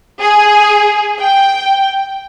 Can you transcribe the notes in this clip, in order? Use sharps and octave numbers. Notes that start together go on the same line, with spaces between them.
G#4
G5